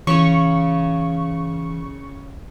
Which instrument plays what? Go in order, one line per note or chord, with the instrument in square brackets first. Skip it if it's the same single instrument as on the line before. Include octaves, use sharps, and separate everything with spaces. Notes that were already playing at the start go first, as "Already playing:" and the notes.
[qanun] C#3 C#5 [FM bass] E3 [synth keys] C#6